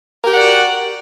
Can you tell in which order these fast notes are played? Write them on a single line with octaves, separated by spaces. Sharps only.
A#4 G4 F#5 D5 F#4